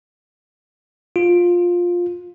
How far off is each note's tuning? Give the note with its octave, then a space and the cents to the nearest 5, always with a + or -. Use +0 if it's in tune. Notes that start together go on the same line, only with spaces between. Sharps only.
F4 +10